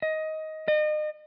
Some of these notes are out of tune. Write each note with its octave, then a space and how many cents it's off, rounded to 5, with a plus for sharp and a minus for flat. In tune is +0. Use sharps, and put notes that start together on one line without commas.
D#5 +15
D#5 -35